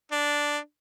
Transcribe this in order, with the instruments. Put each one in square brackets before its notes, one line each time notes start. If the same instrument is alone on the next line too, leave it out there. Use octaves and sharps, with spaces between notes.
[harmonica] D4